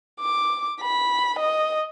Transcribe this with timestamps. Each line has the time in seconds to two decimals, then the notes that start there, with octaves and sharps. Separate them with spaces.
0.21 D6
0.81 B5
1.39 D#5